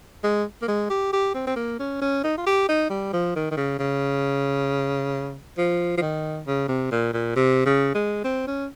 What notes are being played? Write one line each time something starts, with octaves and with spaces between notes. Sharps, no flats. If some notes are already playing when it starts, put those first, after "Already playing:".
G#3
A#3
G#3
G4
G4
C4
C4
A#3
C#4
C#4
D#4
F4
G4
D#4
G3
F3
D#3
D#3
C#3
C#3
F3
F3
D#3
C#3
C3
A#2
A#2
C3
C#3
G#3
C4
C#4